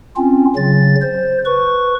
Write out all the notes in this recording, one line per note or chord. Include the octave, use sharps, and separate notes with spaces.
C4 C#4 F4
C#3 F#3 A6
C5
B4 C#6